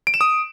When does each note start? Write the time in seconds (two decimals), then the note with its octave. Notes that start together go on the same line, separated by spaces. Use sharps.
0.07 D7
0.14 E7
0.21 D#6